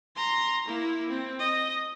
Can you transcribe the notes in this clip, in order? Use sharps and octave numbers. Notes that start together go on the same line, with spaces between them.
A#5 C6
A#3 E4
C4
D#5